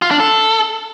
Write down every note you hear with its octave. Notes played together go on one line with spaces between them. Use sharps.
F4
D4
A4